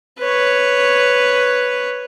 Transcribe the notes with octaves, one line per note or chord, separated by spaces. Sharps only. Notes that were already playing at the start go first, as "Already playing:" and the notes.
B4 C#5